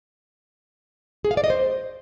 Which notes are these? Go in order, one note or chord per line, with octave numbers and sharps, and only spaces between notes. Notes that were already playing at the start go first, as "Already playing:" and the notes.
G#4
F5
D5
D#5
C5